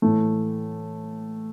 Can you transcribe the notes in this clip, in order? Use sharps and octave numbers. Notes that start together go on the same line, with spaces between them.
A2 E3 A3